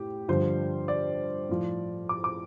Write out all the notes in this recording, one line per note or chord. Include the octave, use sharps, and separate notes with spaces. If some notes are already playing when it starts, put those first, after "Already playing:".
Already playing: A2 G4
G2 D3 F3 C5
D5
A2 F3
D6
D6